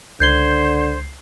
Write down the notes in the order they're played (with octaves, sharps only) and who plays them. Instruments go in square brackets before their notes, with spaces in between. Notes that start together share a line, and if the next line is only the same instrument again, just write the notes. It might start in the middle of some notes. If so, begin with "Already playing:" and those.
[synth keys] C#2 C7 [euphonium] D3 [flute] C5 [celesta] G6 G#6 G7